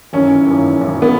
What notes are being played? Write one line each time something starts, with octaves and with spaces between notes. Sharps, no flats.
G#1 F#2 E3 C#4
G#1 F#2 E3
G#1 F#2 E3
B3